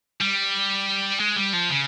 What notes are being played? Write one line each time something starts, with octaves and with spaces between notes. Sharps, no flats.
G3
G#3
G3
F3
C#3